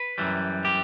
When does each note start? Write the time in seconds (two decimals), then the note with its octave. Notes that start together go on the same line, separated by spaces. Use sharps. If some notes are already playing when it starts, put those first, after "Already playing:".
Already playing: B4
0.18 F#2 E3 G3
0.65 G4